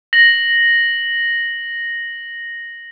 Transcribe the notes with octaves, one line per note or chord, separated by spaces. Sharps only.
A#6 F#7